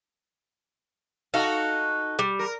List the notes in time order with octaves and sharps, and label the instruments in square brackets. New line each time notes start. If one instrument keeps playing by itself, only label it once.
[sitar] D#4 F#4 A4 [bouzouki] F5
[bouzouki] G3
[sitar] A#4